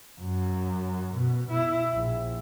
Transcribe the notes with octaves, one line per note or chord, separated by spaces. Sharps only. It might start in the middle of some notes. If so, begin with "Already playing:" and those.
F#2
B2
E4
A#1